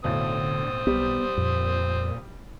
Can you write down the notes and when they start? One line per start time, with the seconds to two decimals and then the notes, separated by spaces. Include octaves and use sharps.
0.04 B1 A2 D3 C4 D#6
0.87 B1 G3 B3
1.37 F2 A#2